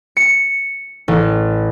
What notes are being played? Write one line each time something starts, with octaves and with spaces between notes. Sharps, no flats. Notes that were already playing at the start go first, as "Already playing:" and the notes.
C#7
A1